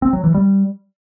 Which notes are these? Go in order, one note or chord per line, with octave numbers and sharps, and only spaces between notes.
C4
F#3
E3
G3